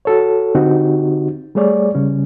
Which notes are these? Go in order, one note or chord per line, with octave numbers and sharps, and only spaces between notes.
F#4 A4 C#5
D3 C4 D#4 F#4 G4
G3 A3 G#4 C#5 D5
C#3 G3 C#4